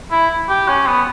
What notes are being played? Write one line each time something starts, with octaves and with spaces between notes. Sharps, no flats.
E4
G4
C#4
B3